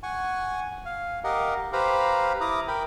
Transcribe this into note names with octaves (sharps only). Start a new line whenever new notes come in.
F#5 G#5 C#6
F5
G4 A#4 D#5 F5 F#5
G4 B4 C5 F5 A#5 B5
E4 A#5 D6 D#6
A#4 G5 B5